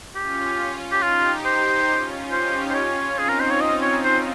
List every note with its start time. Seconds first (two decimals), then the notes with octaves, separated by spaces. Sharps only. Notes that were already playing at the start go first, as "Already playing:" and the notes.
0.15 C#4 F4 G4
0.92 G4
1.02 D#4 F4 G4
1.45 C5
1.88 C#4 F4
2.31 D#4 G4 C5
2.70 C5
2.74 C#4 F4 C#5
3.17 C4 D#4 G#4
3.29 A#4
3.40 C5
3.51 C#5
3.61 D#5
3.82 C#5
4.03 C5